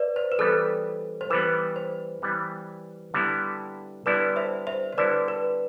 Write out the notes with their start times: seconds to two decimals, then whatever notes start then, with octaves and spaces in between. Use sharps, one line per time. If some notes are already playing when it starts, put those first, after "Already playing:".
Already playing: B4 C5 D5 E5
0.16 C5
0.32 B4
0.38 E3 G3 B3 A4
1.21 C5
1.30 E3 G3 B3 B4
1.76 C5
2.22 E3 G3 B3
3.14 D3 G3 B3 E4
4.06 D3 G3 B3 E4 B4 D5
4.36 C5 E5
4.67 C5 E5
4.93 C5
4.98 D3 G3 B3 E4 B4 D5
5.28 B4